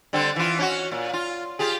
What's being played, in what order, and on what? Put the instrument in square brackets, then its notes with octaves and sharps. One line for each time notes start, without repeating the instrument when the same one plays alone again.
[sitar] D3 G3 C4
E3 F4
C#4 D#4 F#4
A#2
F4
F4 G4 G#4